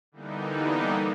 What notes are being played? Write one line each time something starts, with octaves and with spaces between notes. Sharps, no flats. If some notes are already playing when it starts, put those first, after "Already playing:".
D3 E3 G3 A#3 B3 D#4